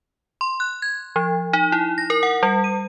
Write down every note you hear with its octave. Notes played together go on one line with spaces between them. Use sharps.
C6
F#6
G#6
F3
D#4
E4
A#6
A#4
F#5
G3
D#7